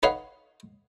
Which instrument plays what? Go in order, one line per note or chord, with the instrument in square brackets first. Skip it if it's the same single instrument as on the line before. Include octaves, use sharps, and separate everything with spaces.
[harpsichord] D#4 B4 C#5 F5 F#5